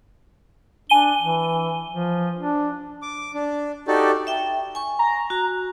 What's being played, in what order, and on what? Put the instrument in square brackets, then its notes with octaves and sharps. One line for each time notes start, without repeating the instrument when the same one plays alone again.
[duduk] D4 [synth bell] G#5 D#7 G7
[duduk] E3
F3
D4
[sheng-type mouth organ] D6
D4
D#4 F#4 G4 A4 D5
[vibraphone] E5 G5
G#5 C#6
[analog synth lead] A#5
[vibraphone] F#4